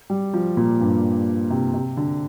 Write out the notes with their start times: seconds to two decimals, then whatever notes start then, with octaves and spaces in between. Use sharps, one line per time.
0.10 G3
0.33 F3
0.57 A#2
0.80 G2
1.50 C3
1.74 C3
1.97 D3